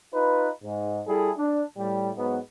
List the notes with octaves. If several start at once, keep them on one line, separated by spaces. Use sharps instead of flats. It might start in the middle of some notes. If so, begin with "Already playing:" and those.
D#4 F4 B4
G#2
G3 E4 G#4 A4
D4
A2 G3
G#2 F#3 B3